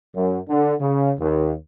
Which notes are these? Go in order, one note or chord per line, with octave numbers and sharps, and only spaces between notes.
F#2
D3
C#3
D#2